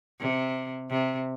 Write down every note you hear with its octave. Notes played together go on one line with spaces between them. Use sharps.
C3
C3